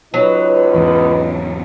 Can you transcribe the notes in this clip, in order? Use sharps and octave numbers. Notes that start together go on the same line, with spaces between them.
C#2 F#3 D#4 B4
E2 G#2 C#3